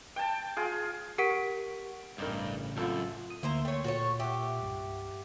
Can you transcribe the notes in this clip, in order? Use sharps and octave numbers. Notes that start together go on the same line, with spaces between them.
G5 A5
F4 G#4
G4 A#4 F#5 C#6 B6 D7
A1 G2 C#3 C4 D#4 A#4
F#2 C4 F4 A4 B5
D#6
D2 A#3 E4 C5 A#5
A3 C#5 G5
A#2 F#4 A4 C#5
G4 E5 F#5
C2 G2